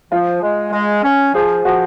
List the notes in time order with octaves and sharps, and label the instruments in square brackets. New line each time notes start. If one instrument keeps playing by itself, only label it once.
[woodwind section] F3 [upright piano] F4
[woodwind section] G#3
G#3
C#4
[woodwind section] F3 [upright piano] G#4
[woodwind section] F3 [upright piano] F#4